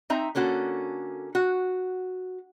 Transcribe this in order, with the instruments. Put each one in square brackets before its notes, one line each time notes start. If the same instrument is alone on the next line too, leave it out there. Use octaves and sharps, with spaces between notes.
[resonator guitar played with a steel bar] C4 D#4 E5 A#5
D3 A#3 C#4 F#4 A4
F#4